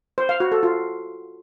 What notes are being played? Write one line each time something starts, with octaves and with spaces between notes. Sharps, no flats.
C5
F5
F#4
A4
F4